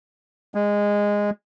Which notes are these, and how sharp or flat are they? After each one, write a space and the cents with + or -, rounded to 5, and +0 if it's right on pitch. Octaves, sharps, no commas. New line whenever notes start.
G#3 -15